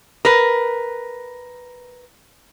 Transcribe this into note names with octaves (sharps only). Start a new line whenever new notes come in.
A#4 B4